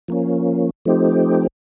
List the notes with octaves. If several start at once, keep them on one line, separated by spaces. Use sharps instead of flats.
F3 A#3 C#4
F3 A3 C4 D#4 G4